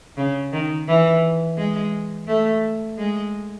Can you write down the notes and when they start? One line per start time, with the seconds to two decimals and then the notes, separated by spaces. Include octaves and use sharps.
0.17 C#3
0.53 D#3
0.88 E3
1.58 G#3
2.28 A3
2.98 G#3